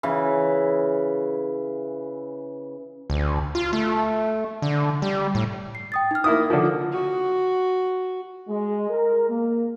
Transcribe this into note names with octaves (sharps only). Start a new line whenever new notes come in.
C#3 E3
D2
F4
A3
D3
G3
A2
C7
G5 D#6 A6
D#4 F6
A#3 E4 D#6
D3 F3
F#4
G#3
A#4
A#3